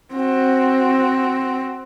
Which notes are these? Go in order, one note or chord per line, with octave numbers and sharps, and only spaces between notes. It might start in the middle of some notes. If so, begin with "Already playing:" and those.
C4 F#4